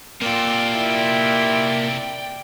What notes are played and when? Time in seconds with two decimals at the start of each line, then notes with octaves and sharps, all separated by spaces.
0.22 C3 A#3 F4 A4 D5 G5
0.71 E4